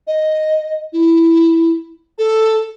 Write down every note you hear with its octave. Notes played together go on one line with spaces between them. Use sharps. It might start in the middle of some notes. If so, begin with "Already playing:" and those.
D#5
E4
A4